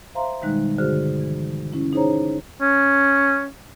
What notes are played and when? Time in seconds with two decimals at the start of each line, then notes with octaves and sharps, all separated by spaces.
0.15 C5 E5 F5 A#5 C6
0.42 B2 D#3 G3 G#3 D#4 F#6
0.78 G2 D3 F#4 G#4 C5 F6
1.21 E3
1.73 C#4 E4
1.93 D#4 G#4 C5 C#5 A#5
2.61 C#4